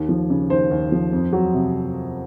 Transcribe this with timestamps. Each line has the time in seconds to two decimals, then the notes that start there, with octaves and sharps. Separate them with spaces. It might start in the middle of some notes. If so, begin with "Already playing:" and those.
Already playing: D#2
0.09 F3
0.30 C#3
0.50 D#2 C5
0.71 D#2
0.92 F3
1.13 F2
1.33 F#3
1.54 C3